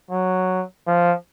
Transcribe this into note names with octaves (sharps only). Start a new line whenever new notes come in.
F#3
F3